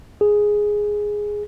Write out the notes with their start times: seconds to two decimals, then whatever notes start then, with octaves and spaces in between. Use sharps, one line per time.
0.21 G#4